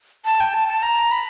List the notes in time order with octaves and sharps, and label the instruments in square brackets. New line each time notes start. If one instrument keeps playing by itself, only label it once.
[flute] A5
G5
A5
A5
A#5
B5